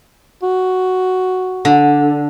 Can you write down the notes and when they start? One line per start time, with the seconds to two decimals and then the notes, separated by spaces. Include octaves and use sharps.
0.42 F#4
1.65 D3